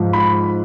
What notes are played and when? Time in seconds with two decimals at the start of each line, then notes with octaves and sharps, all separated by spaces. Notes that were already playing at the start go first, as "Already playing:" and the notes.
Already playing: G#2 F3
0.13 B5